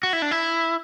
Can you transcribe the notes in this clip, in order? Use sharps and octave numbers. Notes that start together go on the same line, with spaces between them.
F#4
E4
D4
E4